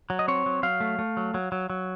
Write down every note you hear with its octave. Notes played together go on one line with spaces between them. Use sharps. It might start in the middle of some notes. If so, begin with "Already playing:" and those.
F#3
D#5
C4 C#5
F#3
F#3 F5
A3
A3
F#3
F#3
F#3
F#3